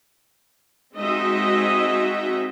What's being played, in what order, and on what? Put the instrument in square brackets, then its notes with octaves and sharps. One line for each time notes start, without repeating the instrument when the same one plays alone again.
[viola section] G#3 C4 D#4 F#4 D#5 E5